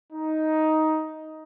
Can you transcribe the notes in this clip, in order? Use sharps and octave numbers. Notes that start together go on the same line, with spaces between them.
D#4